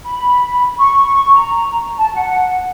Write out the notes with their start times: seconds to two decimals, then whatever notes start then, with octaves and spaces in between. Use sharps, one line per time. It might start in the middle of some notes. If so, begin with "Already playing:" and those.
0.06 B5
0.78 C#6
1.35 A#5
1.98 A5
2.15 F#5